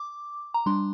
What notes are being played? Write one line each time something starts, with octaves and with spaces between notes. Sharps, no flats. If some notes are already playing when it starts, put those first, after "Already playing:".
Already playing: D6
A#5
G3 D4 C6